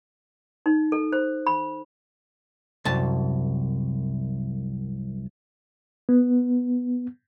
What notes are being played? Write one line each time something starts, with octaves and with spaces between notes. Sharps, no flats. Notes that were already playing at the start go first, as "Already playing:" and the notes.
D#4
A4
C5
B5
C2 F#2 A5
B3